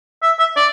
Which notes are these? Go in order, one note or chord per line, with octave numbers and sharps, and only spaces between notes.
E5
E5
D5